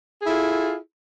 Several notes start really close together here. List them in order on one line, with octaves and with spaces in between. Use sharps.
G#4 E4 A4 F4